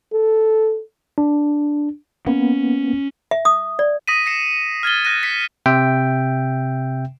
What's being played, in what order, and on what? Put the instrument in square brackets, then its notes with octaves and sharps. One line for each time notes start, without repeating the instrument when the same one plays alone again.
[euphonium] A4
[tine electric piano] D4
[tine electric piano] A#3 B3 [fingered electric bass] C#4
[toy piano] E5
D#6
D5
[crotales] D#6 A#6 B6 D#7
A#6 C7 C#7 E7
F6 G#6 A6 G7
F6 F#6 A#6 D#7
B6 C#7
[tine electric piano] C3 E5 G5